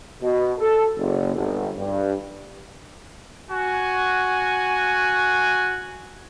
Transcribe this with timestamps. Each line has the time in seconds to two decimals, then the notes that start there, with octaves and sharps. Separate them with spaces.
0.22 B2
0.58 A4
0.97 F#1
1.35 G1
1.77 G2
3.50 F#4 G#5